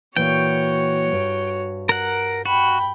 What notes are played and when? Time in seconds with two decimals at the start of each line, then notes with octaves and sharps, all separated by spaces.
0.17 A#2 E3 F#4 C#5 G5
1.12 G2
1.89 A#4 F#5
2.46 F#4 G5 B5